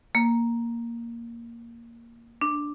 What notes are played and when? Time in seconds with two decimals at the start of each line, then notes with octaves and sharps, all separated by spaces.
0.15 A#3
2.41 D4